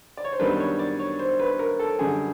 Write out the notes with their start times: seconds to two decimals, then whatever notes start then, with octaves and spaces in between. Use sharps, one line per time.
0.17 D5
0.24 C#5
0.33 C5
0.39 F#2 D#3 G3 B3 D4 B4
0.60 C#5
0.79 D5
0.99 C#5
1.19 C5
1.40 B4
1.59 A#4
1.79 A4
1.99 F#2 D3 G3 G#4